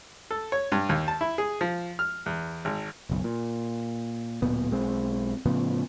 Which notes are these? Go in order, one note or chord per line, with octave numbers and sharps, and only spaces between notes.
A4
C#5
G2
D#2
A5
E4
G#4
F3
F6
E2
G#1
F#1 B1
A#2
D1 A#2 B3
B1 G#3 C4
A2 C#3 F3 B3